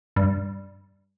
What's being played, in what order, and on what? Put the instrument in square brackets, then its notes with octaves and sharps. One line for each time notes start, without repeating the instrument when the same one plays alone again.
[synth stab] G2